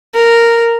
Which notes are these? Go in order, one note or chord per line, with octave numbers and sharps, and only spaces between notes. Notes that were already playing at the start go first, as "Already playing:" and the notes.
A#4